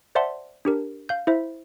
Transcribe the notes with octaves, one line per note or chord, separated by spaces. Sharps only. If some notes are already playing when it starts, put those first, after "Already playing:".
C5 D5 E5 F#5 A5 C6
D4 G4 A#4
F5 G6
E4 C5 E5